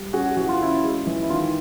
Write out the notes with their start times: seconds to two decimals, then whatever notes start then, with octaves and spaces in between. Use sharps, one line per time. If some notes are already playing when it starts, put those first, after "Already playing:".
Already playing: G3
0.13 C#4 F#4 G#4
0.37 E3 F#4
0.49 F4
0.60 C#4 E4 F#4
0.83 G#3
1.07 E3
1.22 E4
1.30 D#3 F4